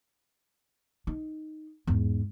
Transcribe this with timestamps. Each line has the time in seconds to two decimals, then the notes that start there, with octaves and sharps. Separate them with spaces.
1.07 D#4
1.87 E2 G#2